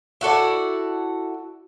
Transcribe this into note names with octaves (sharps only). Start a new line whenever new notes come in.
E4 F#4 A4 D5